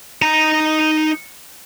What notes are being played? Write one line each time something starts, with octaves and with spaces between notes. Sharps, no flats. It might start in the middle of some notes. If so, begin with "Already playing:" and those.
D#4 A#5